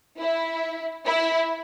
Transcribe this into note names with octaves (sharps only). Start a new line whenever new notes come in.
E4
E4